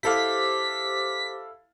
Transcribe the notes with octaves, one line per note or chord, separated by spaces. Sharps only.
E4 G4 A4 C5 F5 D6 B6